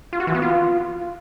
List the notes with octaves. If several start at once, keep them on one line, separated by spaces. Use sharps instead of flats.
F4
F#4
E3
B3
F4